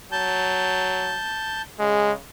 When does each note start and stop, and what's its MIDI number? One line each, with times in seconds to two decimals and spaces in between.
0.12 1.18 54
0.12 1.62 81
0.12 1.62 91
1.79 2.16 49
1.79 2.12 56